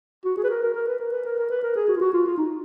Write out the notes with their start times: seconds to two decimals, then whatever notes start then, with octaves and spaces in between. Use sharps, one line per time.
0.25 F#4
0.37 G#4
0.44 B4
0.50 A#4
0.62 A#4
0.74 A#4
0.88 B4
1.00 A#4
1.12 B4
1.25 A#4
1.38 A#4
1.50 B4
1.63 A#4
1.76 G#4
1.88 F#4
1.96 F4
2.01 F#4
2.14 F4
2.26 F4
2.38 D#4